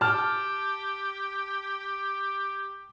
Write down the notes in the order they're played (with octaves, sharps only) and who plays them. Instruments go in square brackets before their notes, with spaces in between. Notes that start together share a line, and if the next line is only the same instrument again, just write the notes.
[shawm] G4 [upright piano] A5 F6